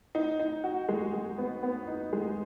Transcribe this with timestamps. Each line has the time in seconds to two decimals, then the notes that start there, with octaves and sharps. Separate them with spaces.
0.15 D#4
0.39 D#4
0.64 F#4
0.89 G#3
1.13 G#3
1.38 B3
1.63 B3
1.87 D#4
2.13 G#3